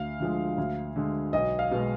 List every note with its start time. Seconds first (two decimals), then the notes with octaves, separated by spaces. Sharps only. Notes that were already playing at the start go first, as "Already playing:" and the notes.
Already playing: D2 F5
0.20 D3 F3 G#3
0.58 D2
0.96 D3 G#3
1.33 B1 D#5
1.59 F5
1.71 B2 G#3